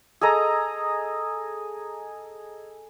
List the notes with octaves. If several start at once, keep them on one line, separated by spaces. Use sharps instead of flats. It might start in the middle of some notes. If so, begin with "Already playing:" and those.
G#4 A4 D#5 A#5